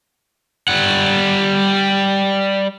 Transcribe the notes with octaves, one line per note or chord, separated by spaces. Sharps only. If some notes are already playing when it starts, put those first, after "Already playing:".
G3 F#5